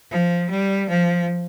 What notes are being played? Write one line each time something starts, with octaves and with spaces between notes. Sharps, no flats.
F3
G3
F3